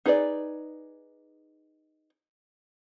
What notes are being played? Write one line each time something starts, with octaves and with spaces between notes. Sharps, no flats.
D#4 G#4 B4 C5 D5